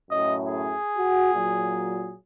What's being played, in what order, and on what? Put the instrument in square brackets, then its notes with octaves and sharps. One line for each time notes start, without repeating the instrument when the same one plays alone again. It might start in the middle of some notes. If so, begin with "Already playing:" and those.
[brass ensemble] F#2 A2 [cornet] D#5
[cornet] G#4
[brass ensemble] F#4 F#5
A#2 F#3